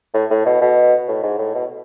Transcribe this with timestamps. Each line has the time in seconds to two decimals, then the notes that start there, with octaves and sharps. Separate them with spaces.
0.14 A2
0.30 A2
0.46 B2
0.61 B2
1.08 A2
1.23 G#2
1.38 A2
1.54 B2